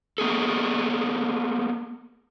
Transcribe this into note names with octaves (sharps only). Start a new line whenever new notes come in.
A#3 B3 G#4 A4